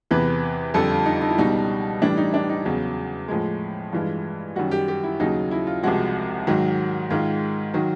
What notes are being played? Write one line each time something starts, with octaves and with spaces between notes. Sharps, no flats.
E2 C3 E3 B4
F2 D3 G3 A4
F4
D#4
D#4
E4
C#2 B2 G3 D#4
A2 E3 G3 D4
D#4
D4
D#4
E2 C#3 F#3
A2 F3 G#3
G2 E3 G#3 F4
F#2 D#3 G3 F#4
G4
G4
E4
D#2 C#3 F#3 D#4
E4
F4
C2 C3 F3 G#3 F#4
G#2 D#3 F#3
G#2 D#3 G#3 F4
D#3 F#3